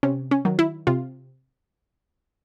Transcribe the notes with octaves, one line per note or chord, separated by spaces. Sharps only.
C3 C#4
C#4
D#3 F#3
E4
C3 F4